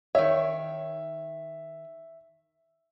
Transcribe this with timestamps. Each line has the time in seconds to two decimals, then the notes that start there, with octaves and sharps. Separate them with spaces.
0.15 D#3 C#5 E5